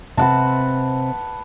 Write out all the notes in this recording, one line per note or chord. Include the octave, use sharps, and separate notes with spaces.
C3 C4 B4 F#5 A5